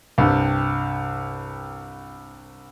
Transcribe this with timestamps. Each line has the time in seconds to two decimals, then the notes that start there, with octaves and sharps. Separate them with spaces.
0.18 C2 G2